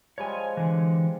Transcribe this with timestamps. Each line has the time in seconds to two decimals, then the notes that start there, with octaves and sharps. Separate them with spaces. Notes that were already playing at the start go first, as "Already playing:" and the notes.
0.18 F3 G3 G#3 C#5 G#5
0.57 D3 E3